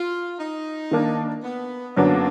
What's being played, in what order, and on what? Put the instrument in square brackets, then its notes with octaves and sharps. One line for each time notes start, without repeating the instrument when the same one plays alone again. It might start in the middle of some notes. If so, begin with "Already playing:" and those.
Already playing: [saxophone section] F4
D#4
[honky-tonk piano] D#3 A#3 D4
[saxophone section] B3
[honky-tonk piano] F#2 D3 F#3 B3 D4 [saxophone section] A#3